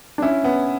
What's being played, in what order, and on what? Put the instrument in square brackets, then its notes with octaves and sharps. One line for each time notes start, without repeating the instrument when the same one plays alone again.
[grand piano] D4
[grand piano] C#4 [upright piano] E4
[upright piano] B3 [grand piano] C#4